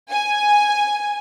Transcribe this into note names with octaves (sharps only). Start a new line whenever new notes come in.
G#5